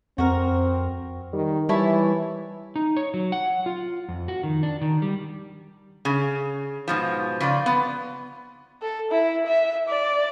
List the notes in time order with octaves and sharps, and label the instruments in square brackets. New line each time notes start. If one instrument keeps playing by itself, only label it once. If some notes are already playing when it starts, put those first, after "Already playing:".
[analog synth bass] F2 [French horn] C4 [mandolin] F#4 A#4
[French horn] D#3 [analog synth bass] G3
[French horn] E3 [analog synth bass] G3 [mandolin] E4 C#5 A5
[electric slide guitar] D#4
C#5
F#3
F#5
F4
F2
F#4
D#3
D4
D#3
G3
[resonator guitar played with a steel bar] C#3
G#2 B2 F3
C#3 F4 D5
B3
[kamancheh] A4
E4
E5
D5